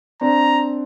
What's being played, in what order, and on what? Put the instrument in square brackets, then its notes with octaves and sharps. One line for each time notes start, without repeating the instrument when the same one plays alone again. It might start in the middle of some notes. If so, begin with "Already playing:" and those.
[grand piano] C4 D4 [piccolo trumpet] A#5